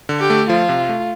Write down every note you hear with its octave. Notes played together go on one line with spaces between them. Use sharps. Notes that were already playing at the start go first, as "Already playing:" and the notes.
D3
G4
A3
F3 F4
C3
A3